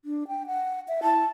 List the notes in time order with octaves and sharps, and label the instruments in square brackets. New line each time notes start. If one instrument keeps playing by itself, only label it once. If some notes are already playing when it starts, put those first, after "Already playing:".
[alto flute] D4
G5
F#5
E5
[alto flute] E4 [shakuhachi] A5